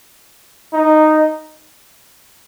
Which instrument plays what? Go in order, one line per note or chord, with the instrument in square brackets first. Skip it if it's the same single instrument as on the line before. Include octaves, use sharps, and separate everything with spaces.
[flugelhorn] D#4